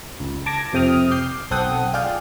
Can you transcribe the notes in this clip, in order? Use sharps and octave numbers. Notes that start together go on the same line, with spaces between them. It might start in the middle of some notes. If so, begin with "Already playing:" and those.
C#2
A5 D6 G#6 A#6
F2 C3 G5 D#6 F6
D6 G6 C7
B1 C4 A4 F#5 G5 D#6
F4 G#4 D5 F5 G5